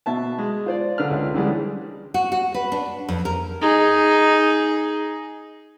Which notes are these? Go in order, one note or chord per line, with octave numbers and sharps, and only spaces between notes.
B2 E5 A5
G#3
F4 C5 D5
D3 B4 F6
C#2
D3 E3 G3 G#3
F#4
F#4
B4
D4
F2
A#4
D#4 G#4